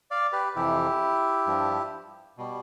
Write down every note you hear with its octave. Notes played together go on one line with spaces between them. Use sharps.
D5 F5
G4 B4
F2 C3 E3 E4 G4
G2 F3
B2 G3